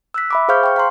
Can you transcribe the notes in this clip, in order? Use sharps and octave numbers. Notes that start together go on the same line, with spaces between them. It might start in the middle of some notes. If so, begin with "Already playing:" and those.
E6 F#6 B6
E5 B5 D6
G#4 C5 F5 C#6 F6 G6
G5 C#6
F5 A#5 C6